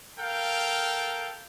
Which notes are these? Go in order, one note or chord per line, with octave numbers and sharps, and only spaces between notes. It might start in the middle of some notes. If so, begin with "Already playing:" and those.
A4 A#4 F5 G5